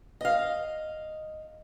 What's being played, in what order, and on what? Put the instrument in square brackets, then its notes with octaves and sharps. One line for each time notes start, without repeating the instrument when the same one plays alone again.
[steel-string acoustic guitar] D#5 F5